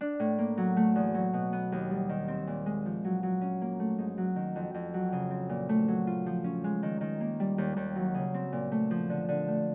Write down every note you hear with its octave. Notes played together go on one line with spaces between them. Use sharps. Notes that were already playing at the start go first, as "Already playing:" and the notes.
D4
A2
A#3
F#3
A3
E2
F#3
B2
B3
D#2
G3
D#3
C4
A#2
G#3
F3
F#3
F#3
C#4
A#3
A3
G#2
F#3
D#3
F2
F2
F#3
C#3
C4
A#2
A3
F#3
F4
F3
C#4
G#3
D#3
D#3
A#3
G3
D#2
D#2
F#3
C#3
C4
A#2
A3
F3
D3
D3
A3